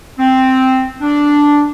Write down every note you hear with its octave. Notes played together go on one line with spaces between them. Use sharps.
C4
D4